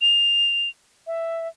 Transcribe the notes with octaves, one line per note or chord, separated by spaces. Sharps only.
F7
E5